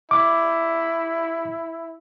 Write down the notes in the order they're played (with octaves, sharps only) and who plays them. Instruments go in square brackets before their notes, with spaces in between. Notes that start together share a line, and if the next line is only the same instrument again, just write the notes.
[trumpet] E4 [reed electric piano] D6